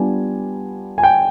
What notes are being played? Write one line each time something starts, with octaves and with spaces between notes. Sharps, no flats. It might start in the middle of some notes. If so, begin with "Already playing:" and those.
Already playing: G3 B3 D4 F4 G#5
G#5
G5